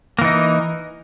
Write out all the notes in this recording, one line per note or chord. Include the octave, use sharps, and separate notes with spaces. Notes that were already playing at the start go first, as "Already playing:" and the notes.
E3 A#3 D#4